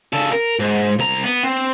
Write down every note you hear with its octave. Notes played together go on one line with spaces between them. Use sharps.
C#3 A4
A#4
G#2
C2 A#5
B3
C4